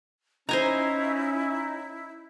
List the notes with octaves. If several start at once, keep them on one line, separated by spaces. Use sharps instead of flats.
C#4 D#4 E4 C5 G#5 A#5